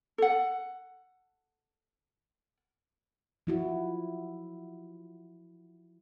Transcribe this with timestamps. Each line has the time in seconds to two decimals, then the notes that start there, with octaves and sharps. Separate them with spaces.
0.18 A4 F#5
3.47 F3 E4 F#4